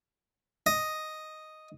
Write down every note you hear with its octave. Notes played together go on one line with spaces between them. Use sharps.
D#5